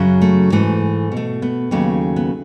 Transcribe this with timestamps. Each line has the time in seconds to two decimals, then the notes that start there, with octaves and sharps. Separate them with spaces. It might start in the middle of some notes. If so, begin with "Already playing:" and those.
Already playing: F#2 C#3 F#3
0.21 A3
0.52 G#2 E3 A3
1.12 B2 A3
1.42 B3
1.71 D#2 C#3 F#3 A3
2.16 B3